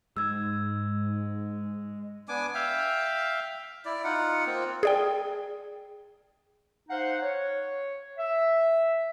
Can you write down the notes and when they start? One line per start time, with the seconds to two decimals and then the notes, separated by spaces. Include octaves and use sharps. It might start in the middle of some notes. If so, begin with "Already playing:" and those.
0.17 G#2 G#3 E6 G#6
2.28 B3 D4 G#5 D6
2.55 E5 F5 G5
3.85 E4 D5
4.04 D#4 F4 F#5
4.46 A#3 C4 F4
4.83 G#4 D5 G5
6.90 D#4 C5 F5 F#5
7.23 C#5
8.18 E5